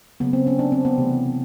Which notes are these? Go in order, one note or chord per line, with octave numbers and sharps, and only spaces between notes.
C#3 F#3 A#3 B3
C4
C#4
D4
C4
B3
C3 E3 A3